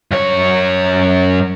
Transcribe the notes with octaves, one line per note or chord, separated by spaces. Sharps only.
F#2 C#5